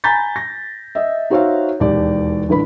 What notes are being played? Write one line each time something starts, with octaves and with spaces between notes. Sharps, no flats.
G#5 A#5 B5 G6 A6 B6
A#6
D#5 E5
D#4 F#4 C5 C#5 E5 F5
E1 D#2 G4 D5
A1 D3 B4 B5